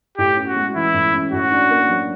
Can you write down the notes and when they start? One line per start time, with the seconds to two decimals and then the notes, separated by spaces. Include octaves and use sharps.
0.18 A2 G4
0.37 C#4
0.47 F#4
0.56 G#3
0.75 E3 E4
0.94 A2
1.13 C#4
1.32 A2 F#4
1.52 D4
1.71 A#3
1.89 F#3